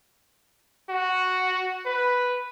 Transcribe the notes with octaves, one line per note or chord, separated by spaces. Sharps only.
F#4
B4